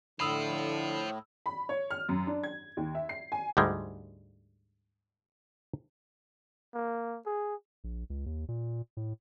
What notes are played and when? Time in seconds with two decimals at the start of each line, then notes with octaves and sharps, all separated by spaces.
0.20 A2 D3 C5 F5 B5 D#6 E6
1.46 B5
1.69 C#5
1.90 F6
2.09 F#2
2.27 D4
2.43 G#6
2.77 D#2
2.95 E5
3.09 C7
3.32 G#5
3.57 D2 G#2 D3 G3 G#3
6.74 A#3
7.26 G#4
7.84 A#1
8.10 C#2
8.26 D#2
8.48 A#2
8.97 A2